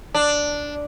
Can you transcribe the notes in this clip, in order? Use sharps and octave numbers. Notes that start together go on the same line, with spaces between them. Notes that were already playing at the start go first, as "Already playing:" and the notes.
D4